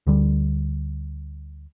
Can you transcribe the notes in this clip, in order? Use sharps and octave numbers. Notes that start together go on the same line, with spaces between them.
D2 D3 G3